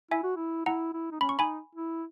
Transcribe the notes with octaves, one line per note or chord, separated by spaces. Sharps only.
E4 E5 G#5
F#4
E4
E4 F#5 A#5
E4
D#4
C#4 B5
C#6
D#4 G#5 B5
E4